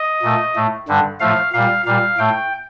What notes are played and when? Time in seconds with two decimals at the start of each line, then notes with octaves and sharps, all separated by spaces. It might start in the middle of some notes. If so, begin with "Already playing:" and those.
Already playing: D#5
0.22 A#2 A3
0.55 A2 A3
0.88 G2 D3 G3
1.20 A2 F3 A3 F5
1.53 A#2 G3 F5
1.85 A#2 G3 F5
2.18 A2 A3 G5